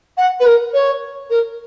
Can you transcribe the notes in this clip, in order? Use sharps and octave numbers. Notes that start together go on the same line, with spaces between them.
F#5
B4
A#4
C#5
A#4